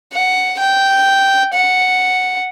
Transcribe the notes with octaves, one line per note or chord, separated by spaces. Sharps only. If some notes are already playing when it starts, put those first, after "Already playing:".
F#5
G5
F#5